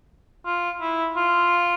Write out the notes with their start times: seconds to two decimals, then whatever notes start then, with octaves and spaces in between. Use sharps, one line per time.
0.46 F4
0.81 E4
1.17 F4